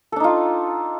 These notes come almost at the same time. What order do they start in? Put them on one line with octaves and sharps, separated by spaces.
A4 D4 D#4 F4